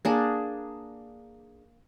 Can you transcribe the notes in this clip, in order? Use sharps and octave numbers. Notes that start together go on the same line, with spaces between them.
A#3 D4 G#4